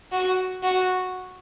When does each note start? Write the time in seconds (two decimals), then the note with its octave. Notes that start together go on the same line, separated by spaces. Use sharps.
0.12 F#4
0.63 F#4